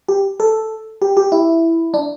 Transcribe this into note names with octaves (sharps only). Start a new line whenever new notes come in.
G4
A4
G4
G4
E4
D4